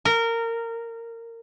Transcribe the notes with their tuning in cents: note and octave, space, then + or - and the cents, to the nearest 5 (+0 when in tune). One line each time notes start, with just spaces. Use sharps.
A#4 -20